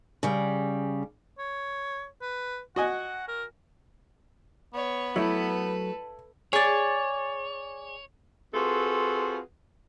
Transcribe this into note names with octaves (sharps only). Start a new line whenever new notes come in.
C#3 G3
C#5
B4
F#4 D#5 F#5 G#5
A#4
B3 C#5
F#3 A3 E4 A4 B4
G#4 C#5 D5
C4 F4 F#4 G#4 A4 B4